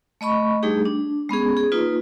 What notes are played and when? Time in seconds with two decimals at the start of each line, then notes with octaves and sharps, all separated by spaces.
0.21 A3 D#5 B5 C#6
0.63 G3 A3 D4 D#4 G4 G#4
0.85 D4
1.29 G#3 B3 C#4 G#4
1.57 G#4
1.72 A#3 D#4 F4 B4